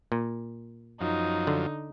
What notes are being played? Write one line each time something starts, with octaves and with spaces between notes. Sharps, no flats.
A#2
F#2 F3 D#4
D3